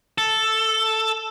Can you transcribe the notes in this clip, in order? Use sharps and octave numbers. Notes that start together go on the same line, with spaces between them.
A4